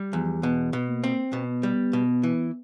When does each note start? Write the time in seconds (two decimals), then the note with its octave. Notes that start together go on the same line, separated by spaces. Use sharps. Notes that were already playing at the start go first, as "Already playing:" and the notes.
Already playing: G3
0.13 E2 F3
0.43 B2 B3
0.73 B2
0.88 A#3
1.04 C4
1.33 B2 B3
1.63 G3
1.93 B2
2.23 E3